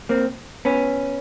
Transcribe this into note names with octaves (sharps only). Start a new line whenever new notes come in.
A#3 C4
B3 C#4